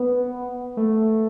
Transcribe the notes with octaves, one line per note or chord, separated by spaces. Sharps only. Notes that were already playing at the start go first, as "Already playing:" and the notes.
Already playing: B3
A3